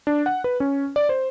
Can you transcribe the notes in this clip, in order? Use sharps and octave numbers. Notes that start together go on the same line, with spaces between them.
D4
F#5
B4
C#4
D5
C5